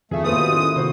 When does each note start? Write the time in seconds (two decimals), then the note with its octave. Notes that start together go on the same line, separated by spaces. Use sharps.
0.11 F2 D#3 A3 G#4 E5
0.24 A2 A3 B3 F4 B4 C5 D#6
0.36 D#3 F#4 G4 D#5
0.52 C#4 E4
0.76 C3 D#3 F#4 C5